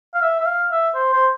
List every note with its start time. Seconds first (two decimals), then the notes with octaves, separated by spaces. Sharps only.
0.14 F5
0.21 E5
0.40 E5
0.45 F5
0.71 E5
0.95 C5
1.13 C5